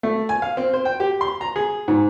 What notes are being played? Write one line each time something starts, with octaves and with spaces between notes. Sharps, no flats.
A3
G#5
F5
C4
C5
G5
G4
C6
A#5
G#4
G#2